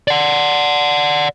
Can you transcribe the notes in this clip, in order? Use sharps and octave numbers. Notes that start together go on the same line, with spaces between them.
D5 F#5